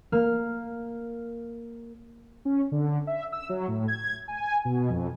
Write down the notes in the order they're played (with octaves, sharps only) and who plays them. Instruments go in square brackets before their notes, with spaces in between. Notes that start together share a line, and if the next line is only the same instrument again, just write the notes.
[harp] A#3 F6
[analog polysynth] C#4
D3
E5
E6
F#3
A2
G#6
G#5
B2
F2